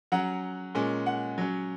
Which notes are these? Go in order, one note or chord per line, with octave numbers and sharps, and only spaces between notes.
F#3 C#4 F#5 A#5
A#2 G#3 C#4
F#5
F#3 C#4